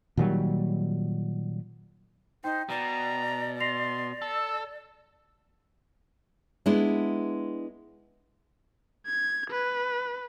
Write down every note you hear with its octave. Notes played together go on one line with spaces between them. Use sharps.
A#2 D#3 F#3 G3
D#4 C5 G5
B2 D5 A#5
C6 A#6 C7 F7
A4 E6
G#3 B3 D4 E4
G#6
B4